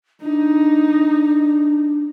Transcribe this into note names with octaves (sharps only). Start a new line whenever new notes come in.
D4 D#4